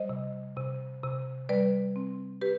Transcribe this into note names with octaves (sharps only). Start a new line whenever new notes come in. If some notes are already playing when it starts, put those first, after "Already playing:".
Already playing: G3 C5 D#5
C3
C3
C3
G3 B4 D5
C4
G4 B4